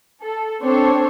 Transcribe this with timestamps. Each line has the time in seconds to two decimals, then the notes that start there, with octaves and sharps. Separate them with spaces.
0.20 A4
0.61 C4 D4 A4 C5 C#5